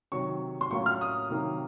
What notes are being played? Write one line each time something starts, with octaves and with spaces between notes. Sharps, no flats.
C3 D#3 F#3 C#6
C6
A2 F#3 A#3 C#4 F4 C#6
F6
D#6
C3 D#3 F#3 A#3 D#4